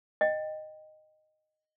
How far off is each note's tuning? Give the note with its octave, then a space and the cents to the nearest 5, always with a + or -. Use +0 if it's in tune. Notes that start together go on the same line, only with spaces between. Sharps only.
D#5 -10 G5 +0